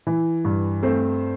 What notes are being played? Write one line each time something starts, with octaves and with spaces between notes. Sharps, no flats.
E3
G2
A3 C4 C5